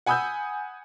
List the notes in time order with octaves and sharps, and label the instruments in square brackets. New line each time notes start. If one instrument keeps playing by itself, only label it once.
[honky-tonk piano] F#5 G#5 B5 D#6 E6 G6